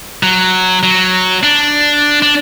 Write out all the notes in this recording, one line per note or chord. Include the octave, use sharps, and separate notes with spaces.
F#3
F#3
D4
D4